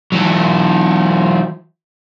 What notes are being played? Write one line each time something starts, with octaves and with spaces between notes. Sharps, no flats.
E3 F#3